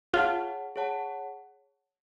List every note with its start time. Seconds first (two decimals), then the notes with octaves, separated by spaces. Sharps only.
0.13 F4 G#4 C#5 F#5 A5
0.76 G#4 C#5 F#5 A5